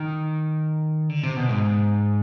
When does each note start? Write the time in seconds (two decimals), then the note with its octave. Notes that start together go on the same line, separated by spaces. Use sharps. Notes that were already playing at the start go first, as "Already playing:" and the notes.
Already playing: D#3
1.09 D3
1.24 C3
1.37 B2
1.49 G#2